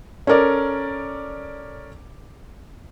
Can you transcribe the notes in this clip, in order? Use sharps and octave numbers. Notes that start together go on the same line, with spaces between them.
C#4 A4 A#4 D5